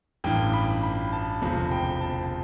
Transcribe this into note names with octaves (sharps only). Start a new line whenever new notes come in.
A1 G2 E3 G5
B5
B5
A5
E1 D2 C3 F3 B5
G5
A5